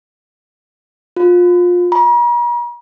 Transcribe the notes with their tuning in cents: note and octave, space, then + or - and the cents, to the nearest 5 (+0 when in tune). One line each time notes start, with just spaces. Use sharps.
F4 +25
A#5 +45